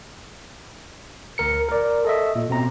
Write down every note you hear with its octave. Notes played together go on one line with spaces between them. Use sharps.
D2 A#4 C#7
A#4 D5
A4 D#5 E5
A#2
B2 C4 A#5